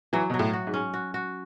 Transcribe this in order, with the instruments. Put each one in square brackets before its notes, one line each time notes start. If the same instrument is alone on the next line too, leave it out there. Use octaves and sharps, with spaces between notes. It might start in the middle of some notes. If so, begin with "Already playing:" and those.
[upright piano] E3 [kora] F#3
[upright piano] B2 [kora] F#3
[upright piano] A2
[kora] F#4
[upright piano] G#2
[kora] C#4
F#4
F#4